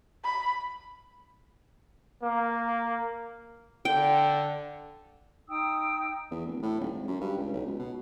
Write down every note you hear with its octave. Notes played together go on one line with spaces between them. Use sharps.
B5
A#3
D3 G5
D#4 G5 D#6 E6
E2
D1
A2
D#1
G#1
F#2
G2
C#2
B1
C#2
B2